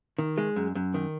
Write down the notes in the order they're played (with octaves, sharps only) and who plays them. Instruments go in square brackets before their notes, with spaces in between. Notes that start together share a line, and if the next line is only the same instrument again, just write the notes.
[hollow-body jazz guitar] D#3
G#3
F#2
F#2
D#3